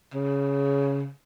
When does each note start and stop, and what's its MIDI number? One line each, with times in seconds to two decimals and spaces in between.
0.14 1.10 49